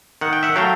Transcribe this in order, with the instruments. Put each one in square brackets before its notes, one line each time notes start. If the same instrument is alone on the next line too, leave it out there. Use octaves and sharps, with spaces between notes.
[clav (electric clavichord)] D#3 F#5
G5
E5 F#5
F#3 A3 F5 G5